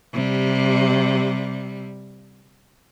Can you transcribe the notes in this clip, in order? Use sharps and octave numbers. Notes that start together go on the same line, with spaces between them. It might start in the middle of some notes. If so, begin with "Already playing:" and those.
C3 G3